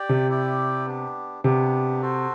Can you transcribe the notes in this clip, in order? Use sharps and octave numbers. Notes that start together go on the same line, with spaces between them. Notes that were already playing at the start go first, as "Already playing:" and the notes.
Already playing: G4 D5 G5
C3
E4 G4 D5 G5
B3 D4 G4
C3 B3 D4 G4
F#4 A4 C5